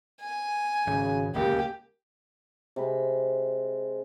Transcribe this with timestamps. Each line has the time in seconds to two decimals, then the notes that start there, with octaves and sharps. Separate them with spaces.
0.21 G#5
0.87 G#1 C#3
1.35 D1 C#2 F#2 A#3 G4
2.76 C3 G#3 B5